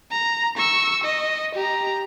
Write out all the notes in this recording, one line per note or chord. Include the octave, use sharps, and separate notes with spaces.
A#5
C#6 E6
D#5
G4 A#5